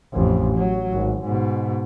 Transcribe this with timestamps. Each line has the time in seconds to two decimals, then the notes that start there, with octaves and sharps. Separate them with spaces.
0.13 A1 F2
0.57 F#3
0.92 G#1
1.24 G#2 B2